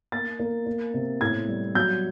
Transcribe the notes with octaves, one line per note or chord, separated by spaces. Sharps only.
A#3 A6
A#3
A#3
C3
A2 G#6
G3
F#3 G6